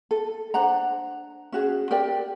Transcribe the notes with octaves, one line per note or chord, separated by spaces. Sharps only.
A4
D4 C5 F#5 A#5
C#4 F#4 G#4
G4 A#4 D5 G5